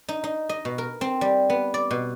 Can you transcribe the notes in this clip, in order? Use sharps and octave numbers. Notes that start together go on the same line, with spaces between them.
D#4
D#4
D#5
B2
A#4
C4
G3
B3
D5
B2